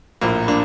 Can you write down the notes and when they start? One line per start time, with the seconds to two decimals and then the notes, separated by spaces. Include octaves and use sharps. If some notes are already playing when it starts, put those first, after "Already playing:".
0.21 A#1 A2 F3 A#3
0.48 A#3 D4